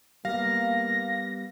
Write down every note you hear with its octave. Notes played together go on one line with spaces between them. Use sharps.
G3 A#3 B3 F5 A#6